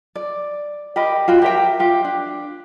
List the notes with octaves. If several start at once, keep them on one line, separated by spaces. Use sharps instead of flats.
D5
G4 A#4 D#5 B5
F4 F#4 G5
G4 A#4 E5 G5
F4 G4
D4